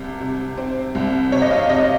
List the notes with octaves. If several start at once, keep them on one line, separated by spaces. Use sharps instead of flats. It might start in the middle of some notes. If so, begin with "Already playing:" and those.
Already playing: C2 C3
C3
C4
C2
C3 C#5
D#5
F5
C3 D#5